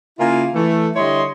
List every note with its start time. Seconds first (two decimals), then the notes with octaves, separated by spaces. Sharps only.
0.19 C#3 A#3 E4 F4 A#4 G#5
0.54 E3 A3
0.96 D3 G3 E4 C#5 D#5 C6